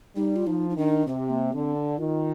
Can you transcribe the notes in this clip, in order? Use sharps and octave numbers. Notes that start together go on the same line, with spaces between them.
G3 D#4
F4
F3 D#4
D#4
D#3 D4
C3 C4
A#3
D3 C4
D4
D#3 F4